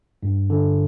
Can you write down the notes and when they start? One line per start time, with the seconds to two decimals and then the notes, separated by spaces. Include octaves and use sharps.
0.23 G2
0.50 D3